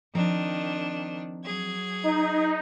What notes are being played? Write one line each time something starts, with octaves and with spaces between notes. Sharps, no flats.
D#3 F3 C4 D4 A#5
F#3 G#4 G#6
D#4